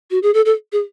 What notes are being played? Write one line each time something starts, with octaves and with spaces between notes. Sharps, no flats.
F#4
G#4
A4
A4
G#4